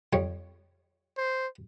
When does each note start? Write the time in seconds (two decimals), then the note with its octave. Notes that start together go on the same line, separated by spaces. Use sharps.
0.13 F2 G3 C#5
1.18 C5